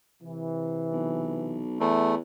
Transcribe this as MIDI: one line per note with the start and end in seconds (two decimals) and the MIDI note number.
0.21 1.65 48
0.21 1.65 52
0.93 1.80 35
1.80 2.18 40
1.80 2.15 57